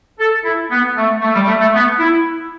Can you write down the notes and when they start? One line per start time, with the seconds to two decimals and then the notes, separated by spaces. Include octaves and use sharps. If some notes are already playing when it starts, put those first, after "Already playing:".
0.19 A4
0.45 E4
0.71 B3
0.97 A3
1.22 A3
1.34 G3
1.47 A3
1.60 A3
1.74 B3
1.99 E4